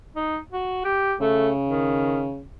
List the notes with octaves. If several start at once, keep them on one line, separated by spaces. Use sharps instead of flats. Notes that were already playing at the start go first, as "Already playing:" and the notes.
D#4
F#4
G4
C#3 A3
D#3